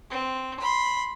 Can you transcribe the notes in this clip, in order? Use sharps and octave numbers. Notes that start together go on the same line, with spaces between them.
C4
B5 C6